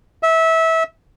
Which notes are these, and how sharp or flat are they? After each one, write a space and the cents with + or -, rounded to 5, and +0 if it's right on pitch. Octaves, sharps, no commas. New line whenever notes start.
E5 -20